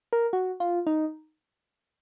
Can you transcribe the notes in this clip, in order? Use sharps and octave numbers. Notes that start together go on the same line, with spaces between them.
A#4
F#4
F4
D#4